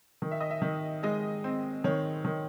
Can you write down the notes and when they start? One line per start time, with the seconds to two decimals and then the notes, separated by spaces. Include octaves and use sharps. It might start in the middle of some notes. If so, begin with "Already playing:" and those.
0.22 D#3
0.31 E5
0.40 D#5
0.50 E5
0.62 D#3
1.03 G#3 D#5
1.44 C4
1.84 D#3 C#5
2.25 D#3